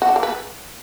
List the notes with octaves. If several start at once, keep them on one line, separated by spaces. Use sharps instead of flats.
F#4
D4
A#3
B4